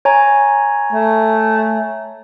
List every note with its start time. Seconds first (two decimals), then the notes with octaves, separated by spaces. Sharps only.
0.05 C#5 G#5 A#5
0.93 A3